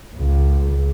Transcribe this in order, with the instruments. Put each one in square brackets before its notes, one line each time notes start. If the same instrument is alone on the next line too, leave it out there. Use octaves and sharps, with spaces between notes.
[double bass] C#2